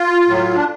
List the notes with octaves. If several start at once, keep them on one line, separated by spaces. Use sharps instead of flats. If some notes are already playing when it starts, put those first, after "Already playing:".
Already playing: F4
A2 F#3
D4